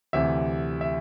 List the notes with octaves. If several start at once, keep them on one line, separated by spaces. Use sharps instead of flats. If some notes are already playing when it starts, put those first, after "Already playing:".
D2 C3 E3 E5
E5